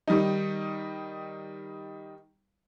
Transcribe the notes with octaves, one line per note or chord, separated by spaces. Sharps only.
D#3 G3 D#4